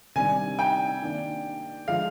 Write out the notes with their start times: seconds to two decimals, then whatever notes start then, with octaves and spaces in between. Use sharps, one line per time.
0.15 C3 D#3 G3 D4 G#5
0.59 G5
1.01 D#3 A#3 D4
1.87 D3 F3 G#3 F5